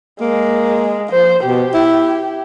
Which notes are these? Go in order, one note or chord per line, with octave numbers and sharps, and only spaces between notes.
G#3 A#3
F3 C5
B2 G4
E4